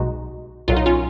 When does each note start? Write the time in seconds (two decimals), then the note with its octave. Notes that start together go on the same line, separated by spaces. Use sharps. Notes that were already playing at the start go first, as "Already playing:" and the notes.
Already playing: B1 B2 G#3 D#4 F#4
0.68 B1 A#2 F#3 F4
0.77 D#4
0.86 C#4 F4